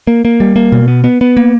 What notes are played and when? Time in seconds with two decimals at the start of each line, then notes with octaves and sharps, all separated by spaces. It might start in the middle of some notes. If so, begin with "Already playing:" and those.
0.07 A#3
0.25 A#3
0.40 G3
0.56 A#3
0.72 B2
0.88 B3
1.04 B3
1.21 B3
1.37 A#3